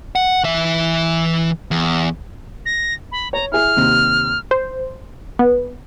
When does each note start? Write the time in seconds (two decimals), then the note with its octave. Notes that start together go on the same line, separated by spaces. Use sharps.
0.15 F#5
0.44 E3 E5
1.71 E2
2.66 A#6
3.12 B5
3.33 C#5 A#5
3.52 E4 G#4 F6
3.77 D#2 C3
4.51 C5
5.39 B3